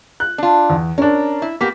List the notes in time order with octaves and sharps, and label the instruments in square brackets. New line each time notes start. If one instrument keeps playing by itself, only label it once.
[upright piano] F#6
[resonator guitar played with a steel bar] D4 F4
[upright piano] E2
[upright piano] C#4 D4 [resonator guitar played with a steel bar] A#4
[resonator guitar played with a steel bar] E4
[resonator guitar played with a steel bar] A#3 B3 G4 [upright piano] B6